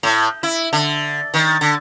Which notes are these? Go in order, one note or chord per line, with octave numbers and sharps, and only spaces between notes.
A2
E4
D3
D#3
D3